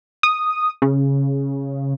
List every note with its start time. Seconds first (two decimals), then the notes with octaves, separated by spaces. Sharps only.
0.23 D#6
0.82 C#3